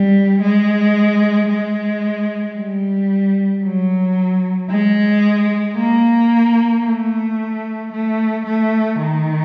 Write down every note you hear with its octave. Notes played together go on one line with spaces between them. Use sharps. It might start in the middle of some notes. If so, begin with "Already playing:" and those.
Already playing: G3
G#3
G#3
G3
F#3
G#3
A#3
A3
A3
A3
D#3